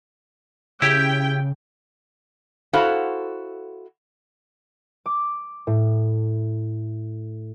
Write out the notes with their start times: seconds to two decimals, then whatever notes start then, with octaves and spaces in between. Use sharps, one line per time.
0.82 C#3 E4 G4 G5
2.73 E4 F#4 A4 C5 F5 F#5
5.06 D6
5.67 A2